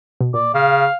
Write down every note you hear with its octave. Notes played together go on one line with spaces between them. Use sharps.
B2
A#2 D5
C#3 F5